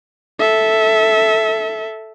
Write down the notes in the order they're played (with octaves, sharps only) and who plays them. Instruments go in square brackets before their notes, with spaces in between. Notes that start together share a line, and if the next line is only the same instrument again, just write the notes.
[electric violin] A4 E5